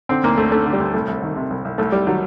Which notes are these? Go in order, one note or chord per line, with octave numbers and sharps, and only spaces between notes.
D3 C4
D2 A#3
D2 A3
D3 A3
D3
G3
D2
C2 A3
C2
D#3
C3
C2
C2
C2 A3
C2 G3
D#3 F#3